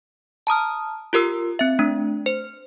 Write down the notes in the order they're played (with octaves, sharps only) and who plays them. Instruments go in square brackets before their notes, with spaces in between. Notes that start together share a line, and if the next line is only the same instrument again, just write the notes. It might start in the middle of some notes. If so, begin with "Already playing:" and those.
[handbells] A5 A#5 D#6 F6
F4 G4 A#4 E6
C4 E5
A3 D4
C5